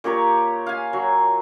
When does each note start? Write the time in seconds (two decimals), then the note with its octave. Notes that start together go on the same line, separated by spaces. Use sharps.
0.04 A#2 G4 C#5 A#5
0.66 F5 G#5
0.93 F#3